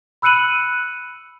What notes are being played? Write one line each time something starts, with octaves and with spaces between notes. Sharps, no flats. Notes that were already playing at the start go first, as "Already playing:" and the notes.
B5 E6 F#6 C#7 D#7 F#7